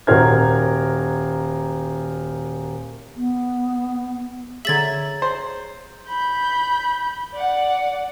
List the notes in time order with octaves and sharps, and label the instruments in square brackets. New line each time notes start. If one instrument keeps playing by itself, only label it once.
[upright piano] D#1 F#4 A#4 C5 F6 G#6
[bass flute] B3
[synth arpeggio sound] D3 E5 [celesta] G#4 C#5 A#5 [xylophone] G#6 A6 F#7
[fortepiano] C5
[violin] B5 G6
D5 F#5